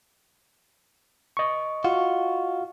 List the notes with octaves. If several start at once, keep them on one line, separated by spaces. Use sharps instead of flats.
D#5 C#6
F4 F#4